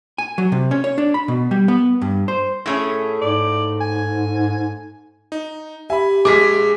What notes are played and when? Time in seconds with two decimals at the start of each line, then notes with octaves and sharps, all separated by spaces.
0.18 G#5
0.38 F#3
0.52 C3
0.71 C#4
0.84 C#5
0.98 D4
1.14 B5
1.28 B2
1.51 G3
1.68 B3
2.01 G2
2.28 C5
2.66 A2 A3 C#4 G#4
3.22 G#2 D5
3.81 G#5
5.32 D#4
5.90 G4 E5 G#5 B5
6.25 A#1 G#3 G#4 G#5 D6 B6